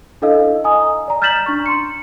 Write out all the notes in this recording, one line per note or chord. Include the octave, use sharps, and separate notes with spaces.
D4 E4 A4 D#5 F5 E6
D#5 G#5 A#5 D#6
D5 A#5
F6 G6 A6 B6 E7 F#7
D4 A#5 C#6
C6 C#7